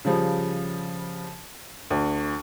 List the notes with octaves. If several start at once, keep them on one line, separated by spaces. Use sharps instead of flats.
C#3 F3 G3
D2